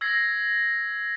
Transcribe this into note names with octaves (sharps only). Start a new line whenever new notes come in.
E6 G#6 A#6 C7